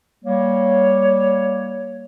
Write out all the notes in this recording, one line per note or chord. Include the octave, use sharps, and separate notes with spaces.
G3 A#3 C#5